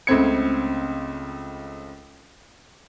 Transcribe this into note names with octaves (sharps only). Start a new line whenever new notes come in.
C#2 C#3 A3 C4 G#6 C#7